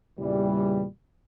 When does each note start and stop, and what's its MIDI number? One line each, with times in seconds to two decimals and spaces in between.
0.19 0.84 40
0.19 0.84 46
0.19 0.84 49
0.19 0.84 52
0.19 0.84 55